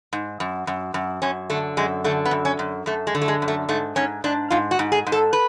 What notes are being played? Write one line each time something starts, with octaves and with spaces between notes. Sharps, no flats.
G#2
F#2
F#2
F#2
F#2 C#4
D3 A3
F#2 G#3
D3 A3
B3
F#2
C#4
F#2
F#2 A3
G#3
D3
A3
G#3
F#2
A3
G#2 A3
G#2 C#4
G#2 D4
G#2 F4
F#4
G#2
G#4
G#2
A4
B4